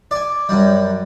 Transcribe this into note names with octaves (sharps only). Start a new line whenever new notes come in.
D5 G#5
F#2 G3